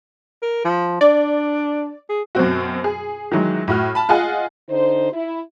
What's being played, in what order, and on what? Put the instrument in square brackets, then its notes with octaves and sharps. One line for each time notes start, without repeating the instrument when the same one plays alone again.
[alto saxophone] A#4
F3
[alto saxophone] D4 [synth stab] D5
[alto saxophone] G#4
[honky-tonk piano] F#2 B2 C4 F#4
G#4
D#3 E3 F#3 G#3
A2 F#4 F6
A5 B5
F4 G#4 D#5 F#5 G#5
[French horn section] D3 D#4 C5
E4